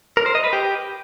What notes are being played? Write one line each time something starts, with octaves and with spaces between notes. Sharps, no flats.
A#4
C5
D#5
B4
G4